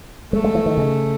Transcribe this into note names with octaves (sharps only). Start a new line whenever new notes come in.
G#3 A3
G#3
E3
D#3
C#3